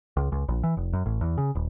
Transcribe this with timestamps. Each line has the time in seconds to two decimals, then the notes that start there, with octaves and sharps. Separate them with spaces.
0.17 C#2
0.32 C#2
0.48 A#1
0.63 E3
0.77 F1
0.93 F#2
1.06 A1
1.21 E2
1.38 C#3
1.55 D#1